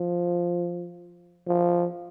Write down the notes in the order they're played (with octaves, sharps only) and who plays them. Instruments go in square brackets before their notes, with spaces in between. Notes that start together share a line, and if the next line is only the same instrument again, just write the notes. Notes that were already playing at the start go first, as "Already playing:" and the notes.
Already playing: [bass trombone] F3
F3